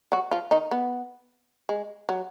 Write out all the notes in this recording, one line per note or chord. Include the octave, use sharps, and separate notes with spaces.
F#3 F#4
F3 F4
D#3 D#4
B3
G#3
F#3